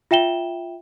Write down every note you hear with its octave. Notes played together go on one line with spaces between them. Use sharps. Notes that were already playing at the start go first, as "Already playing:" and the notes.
F4 E5 G5 E7 G7